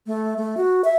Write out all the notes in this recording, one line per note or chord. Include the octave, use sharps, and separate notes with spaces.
A3
A3
F#4
E5